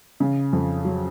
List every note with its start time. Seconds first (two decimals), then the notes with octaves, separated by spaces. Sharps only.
0.20 C#3
0.53 F2
0.85 F#3